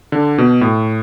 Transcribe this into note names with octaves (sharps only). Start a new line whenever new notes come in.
D3
B2
A2